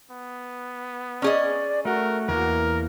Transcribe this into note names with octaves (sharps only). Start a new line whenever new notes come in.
B3
C#4 G#4 D5 D#5
A3 F#4 A#4
E2 E3 A#3 A#4